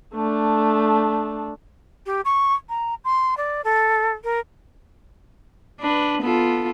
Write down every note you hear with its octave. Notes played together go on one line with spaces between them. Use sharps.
A3 D4
G4
C#6
A#5
C6
D5
A4
A#4
D4 B4
B3 F4 A4